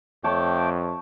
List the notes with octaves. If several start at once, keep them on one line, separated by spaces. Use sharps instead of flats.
F2 A3 C#5 G5 A5 D6